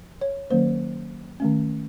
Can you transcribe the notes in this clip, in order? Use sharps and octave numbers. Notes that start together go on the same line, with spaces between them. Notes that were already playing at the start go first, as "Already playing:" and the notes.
Already playing: F3
C#5
D#3 F#3 A#3 C#4 C5
D#3 A3 C#4